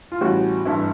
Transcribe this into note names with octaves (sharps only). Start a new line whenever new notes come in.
F4
A1 A2 E3 G3 F#4
G#1 G2 E3 A3 E4